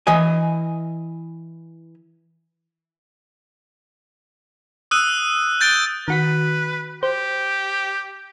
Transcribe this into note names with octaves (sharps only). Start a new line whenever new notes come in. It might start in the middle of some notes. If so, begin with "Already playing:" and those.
E3 D#5 G#5
D#6 E6 F#6 D#7
G6 A6 D7 G7
D#3 F#4 B4 B6
G4 C5